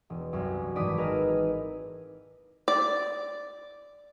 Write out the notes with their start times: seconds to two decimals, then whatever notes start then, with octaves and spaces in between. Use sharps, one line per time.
0.10 E1
0.33 C2 F#2
0.76 G#1 E3 D5 D#6 B6 D#7
0.97 G#4 A#4 B4 D#5 E6 F6
2.68 D5